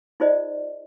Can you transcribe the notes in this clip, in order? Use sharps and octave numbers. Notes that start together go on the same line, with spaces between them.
D#4 F4 G#4 C5 D5 D#5